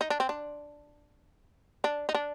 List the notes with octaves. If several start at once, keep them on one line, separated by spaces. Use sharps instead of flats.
D#4
D4
C4
D4
D4
D#4
D4